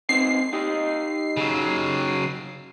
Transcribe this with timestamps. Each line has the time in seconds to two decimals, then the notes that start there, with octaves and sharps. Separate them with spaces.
0.09 B3 C4 D#4 C7
0.53 D#4 G4 D#5
1.37 C#3 F#3